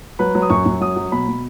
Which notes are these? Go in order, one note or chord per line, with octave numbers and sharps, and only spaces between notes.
F#3 B4
F#3
D#6
F#2 C#6
F#2
F#3 D#6
F#3
B2 B5
B2